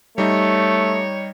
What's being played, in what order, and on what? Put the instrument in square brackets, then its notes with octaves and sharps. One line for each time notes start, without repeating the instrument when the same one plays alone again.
[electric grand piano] G3 D#4 [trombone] A3 [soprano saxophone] C#5